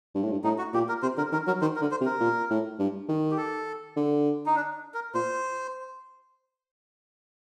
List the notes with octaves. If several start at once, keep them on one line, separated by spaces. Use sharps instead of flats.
G2
A2
G2
A2 D#4
F#4
A#2 G4
A#4
C3 C5
D3 A#4
D#3 A#4
F#3 A#4
D#3 C5
A#4
D3
C5
C3
A#4
A#2
A2
G2
D#3
G4
A4
D3
D#4
D4
A#4
A#2 C5